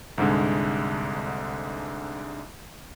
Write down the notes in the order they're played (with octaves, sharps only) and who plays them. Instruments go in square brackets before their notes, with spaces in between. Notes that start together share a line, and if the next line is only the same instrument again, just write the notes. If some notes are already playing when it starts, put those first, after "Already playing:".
[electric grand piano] C2 G#2 D3 G#3